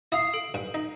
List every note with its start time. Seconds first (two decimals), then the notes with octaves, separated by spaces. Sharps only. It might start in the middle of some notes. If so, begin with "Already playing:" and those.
0.12 E4 F5 D#6 C7
0.34 A4 D7
0.54 G2
0.74 D#4